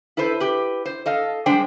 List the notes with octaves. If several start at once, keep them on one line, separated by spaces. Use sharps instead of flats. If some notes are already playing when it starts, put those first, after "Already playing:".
E4 A4 B4 C5
G4 B4
C5
A4 D#5 F5
G3 G#3 D4 C5 G5